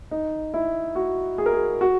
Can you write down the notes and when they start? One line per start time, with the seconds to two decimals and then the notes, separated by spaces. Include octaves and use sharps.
0.11 D#4
0.54 E4
0.95 F#4
1.38 G#4
1.46 A#4
1.53 G#4
1.81 F#4